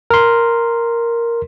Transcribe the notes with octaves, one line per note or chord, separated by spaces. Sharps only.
A#4 C6